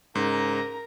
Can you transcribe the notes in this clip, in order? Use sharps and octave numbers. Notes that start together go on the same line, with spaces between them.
G#2 C#3 A#4 A#5